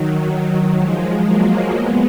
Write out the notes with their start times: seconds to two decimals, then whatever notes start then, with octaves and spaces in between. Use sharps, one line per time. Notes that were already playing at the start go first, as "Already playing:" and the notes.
Already playing: D#3 F#3
0.75 F3 G#3
1.25 F#3 A#3
1.74 G#3 B3